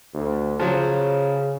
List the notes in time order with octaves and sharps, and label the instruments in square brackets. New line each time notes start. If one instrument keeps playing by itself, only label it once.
[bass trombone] D2
[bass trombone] C#3 [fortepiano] F3 F#3